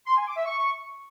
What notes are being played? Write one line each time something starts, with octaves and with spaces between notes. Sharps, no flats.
C6
G#5
D6
E5
C#6